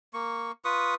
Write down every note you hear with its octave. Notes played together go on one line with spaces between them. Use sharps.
A#3 C#6
F4 B4 C#6 D#6